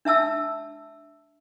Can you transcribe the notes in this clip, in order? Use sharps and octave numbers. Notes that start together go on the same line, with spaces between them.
D4 E5 A5 E6